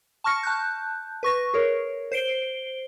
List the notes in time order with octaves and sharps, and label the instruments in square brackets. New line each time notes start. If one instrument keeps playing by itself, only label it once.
[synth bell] A5 C#6 F6 A#6 C#7
A5 F#6 G6
B4 C#6 A#6
G#4 A#4 C#5
C5 C7 D7 G7